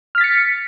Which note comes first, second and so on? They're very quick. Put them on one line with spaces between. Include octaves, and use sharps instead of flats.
F6 B6 A6 C#7